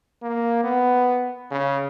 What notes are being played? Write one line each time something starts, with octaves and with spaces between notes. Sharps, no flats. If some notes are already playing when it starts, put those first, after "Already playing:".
A#3
B3
C#3